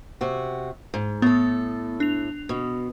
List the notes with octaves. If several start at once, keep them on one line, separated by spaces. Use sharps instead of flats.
C3 F#4
G#2
A2 B3 A4
D4 F7
B2